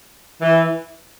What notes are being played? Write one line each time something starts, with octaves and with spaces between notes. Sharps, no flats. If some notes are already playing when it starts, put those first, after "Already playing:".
E3